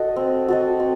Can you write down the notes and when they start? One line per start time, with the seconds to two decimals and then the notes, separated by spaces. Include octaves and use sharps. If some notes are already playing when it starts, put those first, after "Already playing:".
Already playing: F#4 A4 D#5
0.16 C4
0.48 F#4 A4 D#5
0.80 C4